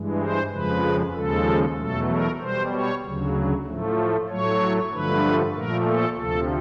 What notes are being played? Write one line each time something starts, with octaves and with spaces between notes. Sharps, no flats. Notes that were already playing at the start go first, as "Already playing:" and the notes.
Already playing: G2 E3 G#3
C5
F2 C#3 F3 G#3 B4
D#2 C#3 F3 G#3 A4
E2 B2 F#3 A3 A4
A#4
B2 G3 C5
C#5
D2 C#3 F#3
A2 F3 A3
A2 F#3 A3 C#5
G2 D3 F3 A3 B4
A#2 F3 A3 A#4
A4
D2 C3 F3 A4